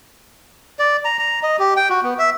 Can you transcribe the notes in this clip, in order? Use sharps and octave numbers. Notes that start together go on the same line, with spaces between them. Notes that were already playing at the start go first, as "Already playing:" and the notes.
D5
A#5
A#5
D#5
G4
G5
F#4
B3
E5